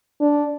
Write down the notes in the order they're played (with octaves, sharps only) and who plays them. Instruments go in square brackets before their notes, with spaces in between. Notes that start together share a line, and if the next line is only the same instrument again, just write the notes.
[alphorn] D4